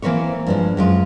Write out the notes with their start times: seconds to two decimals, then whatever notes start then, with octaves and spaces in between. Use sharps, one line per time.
0.02 E3 A#3 C4 B4 C#5
0.47 G2 F3 G#3
0.77 F#2 G#3 F4